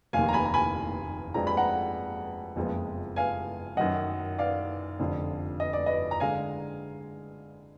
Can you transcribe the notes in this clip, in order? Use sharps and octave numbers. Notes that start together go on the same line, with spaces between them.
F1 D#2 D#3 F5 G#5
A#5
G#5 B5
A#5
G#5 B5
F2 F3 G#3 D4 A#5
B5
F#5 A#5
F#1 F2 F3 G#3 B3
F5 G#5
F#2 D#3 F#3 D#5 F#5
D5 F5
F1 F2 D3
D#5
D5
B4 D#5
A#5
D3 G#3 F5 G#5